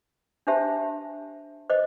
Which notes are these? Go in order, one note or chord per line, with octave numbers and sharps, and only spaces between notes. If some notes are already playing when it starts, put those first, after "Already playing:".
D4 G4 C5 E5 A5
C5 D#5